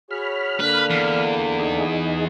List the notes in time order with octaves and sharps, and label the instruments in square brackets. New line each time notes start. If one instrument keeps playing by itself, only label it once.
[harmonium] F#4 G#4 C#5 [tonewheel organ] B5 F6
[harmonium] D3 A#3 D4 [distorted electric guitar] B4
[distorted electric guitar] E2
[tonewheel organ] D#4 G#4